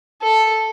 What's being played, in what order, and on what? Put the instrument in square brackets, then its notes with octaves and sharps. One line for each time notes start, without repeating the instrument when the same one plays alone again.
[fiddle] A4